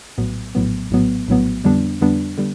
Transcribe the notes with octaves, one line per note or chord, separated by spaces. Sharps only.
A#1 A2 F#3 B3
A#1 A2 F#3 B3
A#1 A2 F#3 B3
A#1 A2 F#3 B3
F2 D3 G3 B3 D4
F2 D3 G3 B3 D4
D3 G3 B3